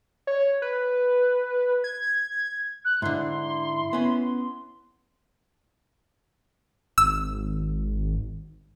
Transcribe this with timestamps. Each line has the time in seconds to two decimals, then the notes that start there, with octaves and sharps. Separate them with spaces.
0.27 C#5
0.62 B4
1.84 G#6
2.85 F#6
3.02 G#2 D3 E4 C6
3.93 B3 C#4
6.98 G#1 E6